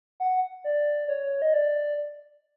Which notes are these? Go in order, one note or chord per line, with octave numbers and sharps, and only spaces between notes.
F#5
D5
C#5
D#5
D5